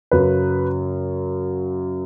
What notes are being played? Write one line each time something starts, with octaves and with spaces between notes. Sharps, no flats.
F#2 C#3 F#3 B4